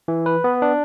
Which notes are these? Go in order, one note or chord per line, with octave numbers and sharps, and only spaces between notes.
E3
B4
B3
D4